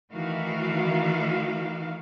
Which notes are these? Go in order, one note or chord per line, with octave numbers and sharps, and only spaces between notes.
D#3 E3 A3 F#4 F5